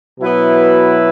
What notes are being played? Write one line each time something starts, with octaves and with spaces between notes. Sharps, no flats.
B2 F#3 B3 E4 B4